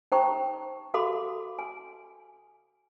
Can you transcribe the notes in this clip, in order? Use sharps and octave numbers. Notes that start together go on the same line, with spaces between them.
D#4 C5 G5 A#5 C#6
F#4 A4 F5 B5 C6 D6
G#5